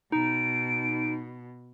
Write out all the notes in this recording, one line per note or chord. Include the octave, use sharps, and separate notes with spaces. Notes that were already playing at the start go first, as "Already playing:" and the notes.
B2 D#4 D7